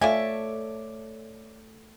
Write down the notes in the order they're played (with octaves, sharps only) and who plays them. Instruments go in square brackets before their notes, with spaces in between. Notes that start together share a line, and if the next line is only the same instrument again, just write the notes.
[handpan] A3 A4 [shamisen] F4 G#5 [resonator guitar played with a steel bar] C#5 D5 E5